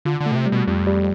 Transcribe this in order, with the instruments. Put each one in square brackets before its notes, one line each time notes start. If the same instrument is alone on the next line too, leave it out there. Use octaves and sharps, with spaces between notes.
[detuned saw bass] D3 [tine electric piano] F4
[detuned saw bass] D3
[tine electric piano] A3
[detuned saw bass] B2
C3
[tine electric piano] G3
[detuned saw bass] B2
[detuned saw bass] F2 [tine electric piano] G3
[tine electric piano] G3